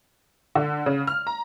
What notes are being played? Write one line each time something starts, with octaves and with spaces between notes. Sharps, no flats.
D3
C#3
F6
A#5